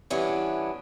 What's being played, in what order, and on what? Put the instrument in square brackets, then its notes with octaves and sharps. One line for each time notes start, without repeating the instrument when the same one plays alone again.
[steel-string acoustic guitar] G2 E3 B3 C#4 D4